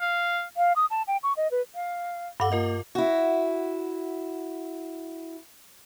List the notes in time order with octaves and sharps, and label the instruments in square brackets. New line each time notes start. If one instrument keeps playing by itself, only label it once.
[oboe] F5
[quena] F5
D#6
A5
G5
C#6
D#5
B4
[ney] F5
[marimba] G2 F#5 [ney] A4 [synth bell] F5 D6
[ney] A#3 [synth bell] F4 A#4 D#5
[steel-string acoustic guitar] E4 F#4